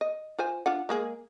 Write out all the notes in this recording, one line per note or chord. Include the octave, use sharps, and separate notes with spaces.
D#5
F4 C5 G#5
D4 F4 F#5
G#3 A#3 G#4